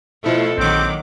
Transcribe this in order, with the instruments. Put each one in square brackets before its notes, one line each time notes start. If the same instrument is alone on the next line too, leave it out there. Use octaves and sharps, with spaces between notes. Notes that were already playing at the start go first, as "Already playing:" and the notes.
[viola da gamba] B2 F3 A4 [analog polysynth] A3 E4
[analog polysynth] A#1 D6 [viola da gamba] D#3 F#3 [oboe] C4